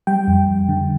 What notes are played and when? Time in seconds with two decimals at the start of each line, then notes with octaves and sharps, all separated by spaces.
0.07 G3 G5
0.28 F2
0.49 F2
0.69 D3